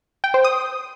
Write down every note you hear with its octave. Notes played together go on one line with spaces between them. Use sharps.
G5
C5
D#6